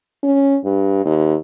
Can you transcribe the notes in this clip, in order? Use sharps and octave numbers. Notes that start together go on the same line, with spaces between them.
C#4
G2
D#2